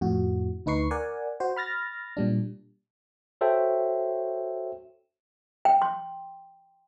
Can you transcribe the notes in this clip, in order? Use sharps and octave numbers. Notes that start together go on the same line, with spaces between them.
F2 A2 F#4
D2 D#4 B4 C#6 C7
A#4 D5 F#5 G#5
F#4 C5
B5 F6 A6 A#6
A#2 G3 D4
F#4 A4 C5 C#5 E5 G5
G5
C6